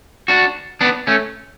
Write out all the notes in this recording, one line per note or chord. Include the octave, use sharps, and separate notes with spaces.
D4 F#4
B3 D4
A3 C#4